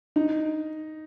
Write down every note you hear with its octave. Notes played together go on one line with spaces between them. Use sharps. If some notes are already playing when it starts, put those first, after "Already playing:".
D#4